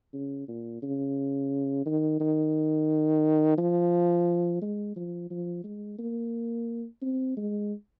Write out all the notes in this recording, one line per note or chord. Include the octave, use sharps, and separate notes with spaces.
C#3
A#2
C#3
D#3
D#3
F3
G#3
F3
F3
G#3
A#3
C4
G#3